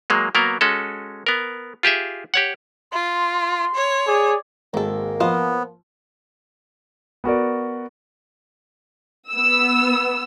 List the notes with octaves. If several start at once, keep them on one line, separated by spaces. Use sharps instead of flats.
F#3 G#3 A#3
F#3 A#3 B3 A#4
G#3 C#4 F#4 A4
B3 A#4
F4 G4 G#4 E5
G4 C#5 F#5
F4 C6
C#5
G#4 D5
G#1 D#3 G#3 A#3 A4
F3 B3 C5 D#5 F5
B3 F#4 A#4 D5
B3 E6